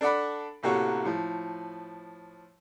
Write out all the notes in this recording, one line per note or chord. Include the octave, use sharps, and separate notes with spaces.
D4 A4 D5 F#5 B5
A1 C3 A#3 F#4 A4 C#5
A2 F3